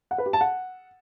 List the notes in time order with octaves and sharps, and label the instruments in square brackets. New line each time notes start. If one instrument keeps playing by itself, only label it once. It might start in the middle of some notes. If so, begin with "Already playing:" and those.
[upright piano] F#5
B4
G4
A5
F#5